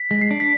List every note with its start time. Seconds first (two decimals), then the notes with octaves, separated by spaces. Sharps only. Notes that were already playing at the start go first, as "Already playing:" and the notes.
Already playing: B6
0.11 G#3
0.21 C7
0.31 D4
0.40 B6